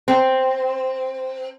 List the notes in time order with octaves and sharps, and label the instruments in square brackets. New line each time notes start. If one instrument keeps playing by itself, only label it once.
[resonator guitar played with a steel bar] C4